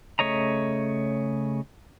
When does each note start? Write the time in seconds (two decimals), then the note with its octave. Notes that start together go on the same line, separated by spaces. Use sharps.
0.19 C#3 A3 C#5 D#5 A#5